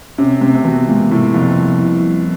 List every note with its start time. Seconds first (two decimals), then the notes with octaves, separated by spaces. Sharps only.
0.18 C3 C#4
0.41 C3 A3
0.55 C3
0.64 B2 E3
0.88 A#2 G#3
1.11 A2 C3
1.34 F2 C3
1.57 G3
1.80 E4
2.03 G3